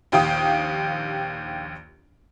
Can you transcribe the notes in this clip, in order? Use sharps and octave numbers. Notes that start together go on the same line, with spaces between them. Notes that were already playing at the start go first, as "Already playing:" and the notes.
A#1 D#2 G4 F5 G5 D#6